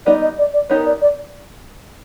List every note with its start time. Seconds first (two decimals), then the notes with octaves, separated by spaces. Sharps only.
0.06 G3 B3 D#4 D5
0.22 D#5
0.38 D5
0.53 D5
0.69 B3 D#4 G4 A#4 C#5
0.86 D5
1.01 D5